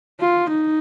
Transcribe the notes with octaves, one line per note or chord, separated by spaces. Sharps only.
F4
D#4